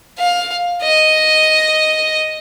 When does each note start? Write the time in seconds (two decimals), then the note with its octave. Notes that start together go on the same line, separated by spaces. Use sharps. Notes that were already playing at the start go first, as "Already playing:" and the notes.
0.18 F5
0.83 D#5